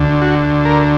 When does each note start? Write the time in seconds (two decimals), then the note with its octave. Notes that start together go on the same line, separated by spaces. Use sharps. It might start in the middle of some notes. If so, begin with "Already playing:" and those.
Already playing: D2 D3
0.22 F#4
0.65 A#4